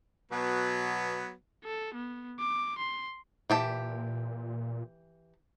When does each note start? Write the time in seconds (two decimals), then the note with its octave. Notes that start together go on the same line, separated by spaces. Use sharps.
0.32 B2 F#3 B3
1.64 A4
1.94 B3
2.39 D6
2.78 C6
3.50 A#2 E3 G4 A5